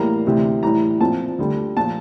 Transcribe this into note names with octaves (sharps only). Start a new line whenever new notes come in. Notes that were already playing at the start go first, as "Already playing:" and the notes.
Already playing: A2 E3 G3 A#3 A#5
D2 C3 E3
A2 E3 G3 A#5
A#2 F3 C4 A5
D2 D3 G3
A#2 F3 A5